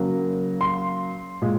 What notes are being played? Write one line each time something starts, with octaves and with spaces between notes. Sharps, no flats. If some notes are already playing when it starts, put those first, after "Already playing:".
Already playing: C#3 F#3 A#3
C6
A#2 G#3